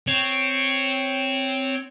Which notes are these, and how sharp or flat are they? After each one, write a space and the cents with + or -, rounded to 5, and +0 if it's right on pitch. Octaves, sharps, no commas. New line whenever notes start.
C4 +0 C#5 +0